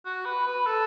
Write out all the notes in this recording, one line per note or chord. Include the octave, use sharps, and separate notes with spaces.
F#4
B4
B4
A4